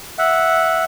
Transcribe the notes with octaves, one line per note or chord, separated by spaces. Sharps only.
E5 F#5